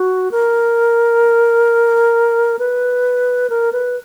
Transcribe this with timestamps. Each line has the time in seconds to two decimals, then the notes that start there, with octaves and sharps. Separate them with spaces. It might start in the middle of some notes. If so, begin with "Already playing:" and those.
Already playing: F#4
0.31 A#4
2.59 B4
3.50 A#4
3.73 B4